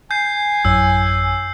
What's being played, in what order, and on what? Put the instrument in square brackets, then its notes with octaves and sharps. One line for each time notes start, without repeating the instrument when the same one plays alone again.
[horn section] G#5 [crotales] G6 C7
[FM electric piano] A1 F#2 [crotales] E6